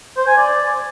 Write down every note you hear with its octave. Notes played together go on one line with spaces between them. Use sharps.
C5
G#5
D5